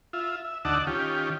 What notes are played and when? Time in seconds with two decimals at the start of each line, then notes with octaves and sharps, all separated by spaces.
0.13 F4 E5
0.45 E5
0.65 D2 D#4 D5 F#5 A5 E6
0.87 D#3 C#4 F4 G4